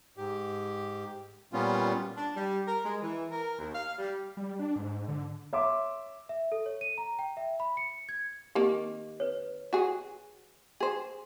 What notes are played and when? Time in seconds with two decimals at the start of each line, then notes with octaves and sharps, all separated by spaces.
0.17 G#2 G4
1.53 A#2 G3 B3 C#4 F4
2.16 D4
2.36 G3
2.67 A#4
2.85 G#3
3.01 E3
3.30 A#4
3.58 D#2
3.73 F5
3.98 G3
4.37 G3
4.59 D4
4.76 G#2
5.08 D3
5.53 C#5 E5 C6 D6
6.29 E5
6.52 A4
6.66 C#5
6.81 D#7
6.98 A#5
7.19 G5
7.37 E5
7.60 B5
7.77 C#7
8.09 G#6
8.55 D#3 A#3 G4
9.20 B4 C#5
9.73 F#4 G#4
10.80 G#4 C5